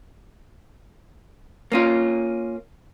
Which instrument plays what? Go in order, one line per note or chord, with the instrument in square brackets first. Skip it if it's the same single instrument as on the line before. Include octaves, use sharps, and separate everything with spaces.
[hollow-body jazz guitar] A#3 C#4 F4